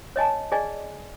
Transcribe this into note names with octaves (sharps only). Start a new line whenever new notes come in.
C#5 D#5 G#5 A5
G#4 D5 D#5 G#5